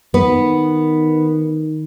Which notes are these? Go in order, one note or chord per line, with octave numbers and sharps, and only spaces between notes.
D#3 B3 B4 D#5